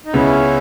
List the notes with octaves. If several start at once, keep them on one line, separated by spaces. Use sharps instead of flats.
D#4
C#2 C#3 G#3 B3 C#4 E4